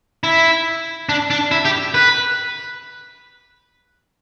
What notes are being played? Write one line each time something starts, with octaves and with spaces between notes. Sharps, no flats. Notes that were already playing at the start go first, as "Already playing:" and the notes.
E4
D4
D4
E4
G4
B4